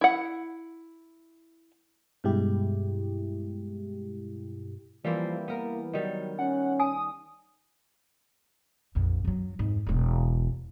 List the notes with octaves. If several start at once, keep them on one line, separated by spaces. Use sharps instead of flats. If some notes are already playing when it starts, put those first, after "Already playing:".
E4 F#5
G2 B2 G#3 E4 G4
E3 F3 G3 A#3 C4
A#3 B3 A#4
D#3 F#3 G3
C#4 F#5
G#5 D#6
A#1 F2
F#2 F#3
F2 G#2
E1 G#3